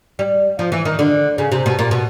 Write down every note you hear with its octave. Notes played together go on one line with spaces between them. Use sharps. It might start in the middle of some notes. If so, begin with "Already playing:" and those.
G3
F3
E3
D#3
D3
C#3
C3
B2
A#2
B2